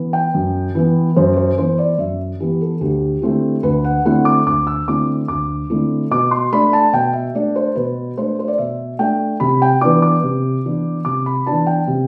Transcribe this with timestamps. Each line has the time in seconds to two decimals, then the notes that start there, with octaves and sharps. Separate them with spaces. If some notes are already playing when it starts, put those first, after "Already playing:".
Already playing: E3 B3
0.13 G5
0.34 F#2
0.75 E3 B3
1.16 F#2 C5
1.37 C5
1.58 E3 B3 C5
1.78 D5
1.98 F#2 E5
2.40 E3 B3 G4
2.61 A4
2.81 D2 G4
3.22 D3 A3 C4 E4
3.63 D2 B4
3.84 F#5
4.05 D3 A3 C4 E4 F#5
4.25 D6
4.47 D2 D6
4.67 E6
4.88 D3 A3 C4 E4 D6
5.28 D2 D6
5.70 D3 A3 C4 E4
6.11 B2 D6
6.31 C6
6.52 A3 D4 B5
6.73 A5
6.93 B2 G5
7.13 E5
7.35 A3 D4 D5
7.56 C5
7.75 B2 B4
8.18 A3 D4 C5
8.39 C5
8.48 D5
8.58 B2 E5
8.99 A3 D4 G5
9.40 C3 B5
9.62 G5
9.81 E3 B3 D4 D6
10.02 D6
10.23 C3
10.65 E3 B3 D4
11.05 C3 D6
11.26 B5
11.47 E3 B3 D4 A5
11.67 G5
11.87 C3